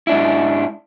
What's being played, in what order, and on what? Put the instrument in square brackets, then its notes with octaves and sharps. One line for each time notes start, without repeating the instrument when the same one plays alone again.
[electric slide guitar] G#2 D4 E4